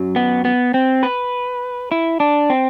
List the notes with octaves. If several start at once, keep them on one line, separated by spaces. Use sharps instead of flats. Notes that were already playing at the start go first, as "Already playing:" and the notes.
Already playing: F#2 F#3
B3
B3
C4
B4
E4
D4
C4